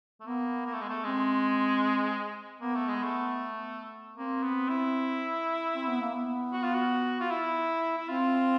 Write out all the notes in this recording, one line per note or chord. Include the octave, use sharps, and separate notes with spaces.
A3
A#3 B3
A#3
A3
G#3
A3
G#3 C4
A#3 B3
A3
G#3
A3
A#3 C4
B3
E4
C4
B3
A#3
B3
F#4
F4
F#4
F4
E4
E4
C4 F4